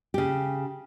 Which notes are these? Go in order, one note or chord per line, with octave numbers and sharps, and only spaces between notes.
C#3 G4